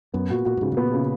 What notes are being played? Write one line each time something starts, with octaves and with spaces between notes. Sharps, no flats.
F#2 B3
A#2 F#4
A#2 F#4
A#2
G#2 C#3
G#2
A#2 B3
C#3